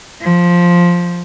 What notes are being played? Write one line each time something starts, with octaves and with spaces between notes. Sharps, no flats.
F3